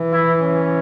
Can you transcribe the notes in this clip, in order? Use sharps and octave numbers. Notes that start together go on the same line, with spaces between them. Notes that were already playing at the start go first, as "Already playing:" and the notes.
Already playing: E3
E4
C#4